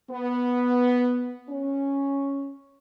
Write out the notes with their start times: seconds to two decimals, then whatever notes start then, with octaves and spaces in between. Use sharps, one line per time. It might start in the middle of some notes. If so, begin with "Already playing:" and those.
0.11 B3
1.50 C#4